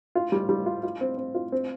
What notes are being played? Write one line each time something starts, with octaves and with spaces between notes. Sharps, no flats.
F4
G3
G3
F4
F4
C4
C4
F4
C4